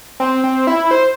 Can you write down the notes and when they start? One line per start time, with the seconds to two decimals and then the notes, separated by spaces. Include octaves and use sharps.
0.20 C4
0.44 C4
0.67 E4
0.91 C5